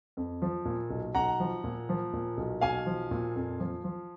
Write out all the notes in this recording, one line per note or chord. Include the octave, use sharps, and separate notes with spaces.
F2
F3
A#2
B1
B1 F#5 A#5
F3
A#2
F3
A#2
B1
B1 F5 G#5
F3
A#2
F2
F3
F3